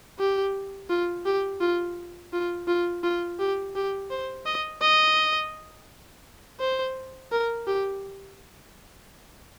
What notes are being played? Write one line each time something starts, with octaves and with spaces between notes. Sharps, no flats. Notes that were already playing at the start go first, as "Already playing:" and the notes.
G4
F4
G4
F4
F4
F4
F4
G4
G4
C5
D#5
D#5
C5
A#4
G4